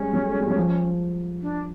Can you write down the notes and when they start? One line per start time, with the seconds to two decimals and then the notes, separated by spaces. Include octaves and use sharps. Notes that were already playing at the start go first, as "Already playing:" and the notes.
Already playing: G3 G#3 C#4
0.13 F#3
0.25 A3
0.32 G#3
0.41 G3
0.48 F#3
0.56 F3
1.41 D4